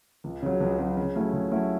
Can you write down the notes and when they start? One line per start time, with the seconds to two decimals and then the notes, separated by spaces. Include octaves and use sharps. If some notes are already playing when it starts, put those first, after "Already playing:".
0.24 C#2
0.43 C#3 F#3
0.61 C#2
0.79 C#3 F#3
0.97 C#3
1.15 F#3 A3 C#4 E4
1.33 C#3
1.51 F#3 A3 C#4 E4